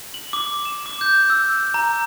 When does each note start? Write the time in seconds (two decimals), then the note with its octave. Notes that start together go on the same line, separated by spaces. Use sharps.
0.14 F#7
0.33 D6
0.65 E7
0.86 D6
1.01 G6
1.30 E6
1.74 A#5